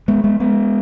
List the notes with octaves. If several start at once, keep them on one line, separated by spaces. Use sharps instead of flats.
G#3 B3
G#3 B3
G#3 B3